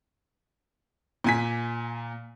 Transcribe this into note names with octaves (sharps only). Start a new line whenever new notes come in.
A#2 G#5 B6